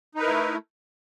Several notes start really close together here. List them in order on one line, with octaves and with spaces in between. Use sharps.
D#4 B4 A#4 E4 A3